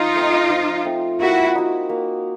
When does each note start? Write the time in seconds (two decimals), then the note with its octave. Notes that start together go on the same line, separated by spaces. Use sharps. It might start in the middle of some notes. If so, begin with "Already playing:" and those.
Already playing: F3 D#4 F4
0.15 A3 C4
0.51 F3
0.85 A3 C4
1.20 A#3 E4 F#4
1.55 D#4 F#4
1.89 A#3